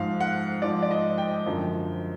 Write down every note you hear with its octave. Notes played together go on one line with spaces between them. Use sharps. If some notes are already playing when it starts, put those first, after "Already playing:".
Already playing: G#2 F3 F5
F#5
G#2 F3 D5
D5
D#5
G5
F#2 D3 F3